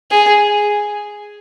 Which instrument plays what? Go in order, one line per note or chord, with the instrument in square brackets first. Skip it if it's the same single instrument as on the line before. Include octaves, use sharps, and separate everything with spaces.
[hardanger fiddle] G#4